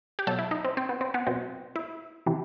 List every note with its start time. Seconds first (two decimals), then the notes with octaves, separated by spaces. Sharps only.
0.19 G4
0.27 B2 F#3 A4
0.39 E4
0.51 D#4
0.65 C4
0.77 C4
0.89 B3
1.01 C4
1.14 B3
1.27 B2 F#3 C4
1.76 E4
2.26 C3 E3